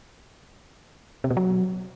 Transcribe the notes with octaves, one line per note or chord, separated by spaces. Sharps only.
C3
B2
F#3